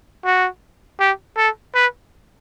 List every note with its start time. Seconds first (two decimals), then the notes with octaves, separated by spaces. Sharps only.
0.25 F#4
1.00 G4
1.37 A4
1.75 B4